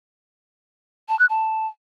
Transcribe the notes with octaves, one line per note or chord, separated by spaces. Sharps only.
A5
F#6
A5